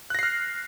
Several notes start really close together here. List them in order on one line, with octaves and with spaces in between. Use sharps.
F#6 A#6 C7 F6